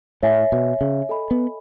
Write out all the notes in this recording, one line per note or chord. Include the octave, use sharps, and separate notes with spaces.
A2 C#5 E5 G#5
B2
C#3
A4 D#5 G#5 B5
B3